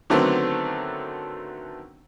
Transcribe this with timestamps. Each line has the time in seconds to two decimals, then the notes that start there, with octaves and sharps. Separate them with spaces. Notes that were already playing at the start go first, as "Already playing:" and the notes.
0.10 D3 D#3 F#3 A3 B3 C4